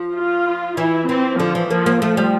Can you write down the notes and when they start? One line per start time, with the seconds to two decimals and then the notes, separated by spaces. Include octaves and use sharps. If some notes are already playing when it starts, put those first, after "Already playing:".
Already playing: F3
0.15 F4
0.77 E3 E4
1.09 E3 C4
1.39 D3 F3
1.55 E3
1.70 F3 A#3
1.86 A#3
2.02 F3 A3
2.17 G3